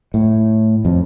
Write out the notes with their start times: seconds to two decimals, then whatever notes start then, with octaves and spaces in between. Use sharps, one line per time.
0.14 A2
0.85 F2